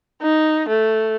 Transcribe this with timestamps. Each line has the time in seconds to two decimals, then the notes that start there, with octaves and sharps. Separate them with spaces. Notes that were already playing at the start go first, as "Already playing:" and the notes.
0.22 D#4
0.69 A3